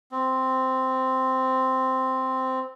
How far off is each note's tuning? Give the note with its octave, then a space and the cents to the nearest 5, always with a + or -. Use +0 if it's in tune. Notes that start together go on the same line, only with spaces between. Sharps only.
C4 -5